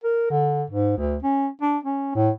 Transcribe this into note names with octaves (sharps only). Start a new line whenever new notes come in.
A#4
D3
G#2
D2
C#4
D4
C#4
A2